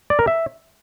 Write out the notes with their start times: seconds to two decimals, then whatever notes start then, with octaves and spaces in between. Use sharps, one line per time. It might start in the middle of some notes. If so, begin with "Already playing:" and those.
0.10 D5
0.19 A#4
0.27 E5